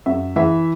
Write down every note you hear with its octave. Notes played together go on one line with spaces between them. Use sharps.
F#2 E5
E3 E5